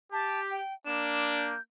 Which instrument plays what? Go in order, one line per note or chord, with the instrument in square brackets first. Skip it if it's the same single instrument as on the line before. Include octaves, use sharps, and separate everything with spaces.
[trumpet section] G4 [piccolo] A5
[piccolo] G5
[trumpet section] A#3 D4 [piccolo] E7
[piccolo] G6